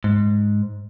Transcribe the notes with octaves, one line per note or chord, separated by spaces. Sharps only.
G#2